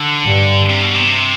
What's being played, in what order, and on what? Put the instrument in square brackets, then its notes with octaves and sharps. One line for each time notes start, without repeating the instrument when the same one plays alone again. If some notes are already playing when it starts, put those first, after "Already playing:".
Already playing: [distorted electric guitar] D3
[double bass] G2
[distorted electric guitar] C3
B2
C3